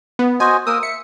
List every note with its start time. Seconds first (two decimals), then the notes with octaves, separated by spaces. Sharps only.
0.19 B3
0.40 F#4 C5 D#5 G#5
0.67 A#3 A#4 D#6 E6
0.83 E5 C#7